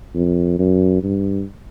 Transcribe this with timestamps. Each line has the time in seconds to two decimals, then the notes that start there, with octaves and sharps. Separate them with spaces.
0.15 F2
0.59 F#2
1.03 G2